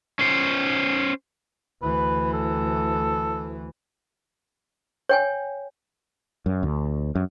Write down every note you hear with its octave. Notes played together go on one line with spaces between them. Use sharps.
C#4 C5
D2 E3 B4
A4
C#5 G5 G#5
F#2
D2
F#2